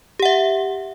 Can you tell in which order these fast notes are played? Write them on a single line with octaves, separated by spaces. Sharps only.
G4 F#5 E5